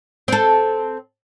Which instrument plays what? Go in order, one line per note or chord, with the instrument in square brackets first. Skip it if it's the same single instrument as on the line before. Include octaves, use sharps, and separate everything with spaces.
[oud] C4 A4